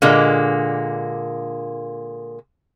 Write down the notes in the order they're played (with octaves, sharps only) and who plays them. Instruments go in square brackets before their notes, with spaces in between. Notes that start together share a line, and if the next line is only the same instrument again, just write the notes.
[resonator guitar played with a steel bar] A#2 D3 G#3 A#3